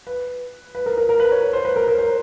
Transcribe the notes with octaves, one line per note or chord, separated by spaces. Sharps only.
B4
B4
A#4
A#4
A#4
B4
C#5
C#5
C5
B4
A#4
A#4
C5